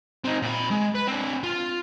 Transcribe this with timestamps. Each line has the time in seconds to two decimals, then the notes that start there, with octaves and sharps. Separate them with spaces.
0.24 C4 D#4
0.42 A#2 B5
0.71 G#3
0.95 B4
1.08 C4 D4
1.43 F4